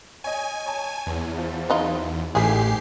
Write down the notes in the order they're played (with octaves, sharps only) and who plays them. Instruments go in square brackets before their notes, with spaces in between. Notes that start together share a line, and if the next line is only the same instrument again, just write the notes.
[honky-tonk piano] C#5 D#5 [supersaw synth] G#5
[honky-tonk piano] C#5 A5
[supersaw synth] E2
[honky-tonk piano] F3
[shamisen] F#3 D#4 F4
[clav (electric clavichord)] A1 [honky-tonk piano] G#2 G#5 B6 [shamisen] E4 G#4 [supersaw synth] G4 C7